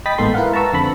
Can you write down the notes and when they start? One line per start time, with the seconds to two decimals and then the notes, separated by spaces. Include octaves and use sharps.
0.06 D#5 G5 B5 D#6 A6 B6
0.18 A1 G#2 A#3 B3 A4 C6
0.34 E4 A#4 B4 F5 F#5
0.52 B4 A5 A#5 C#6 E6
0.73 F2 D3 C4 A5 B5